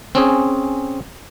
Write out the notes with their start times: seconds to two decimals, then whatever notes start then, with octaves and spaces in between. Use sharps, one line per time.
0.15 C4 C#4 G#4